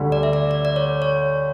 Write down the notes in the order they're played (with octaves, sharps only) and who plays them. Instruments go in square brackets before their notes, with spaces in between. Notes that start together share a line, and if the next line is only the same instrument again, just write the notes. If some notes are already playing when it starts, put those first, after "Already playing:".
Already playing: [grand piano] D2 D3 G3
[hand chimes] D5
E5
D5
D5
D5
C#5
C#5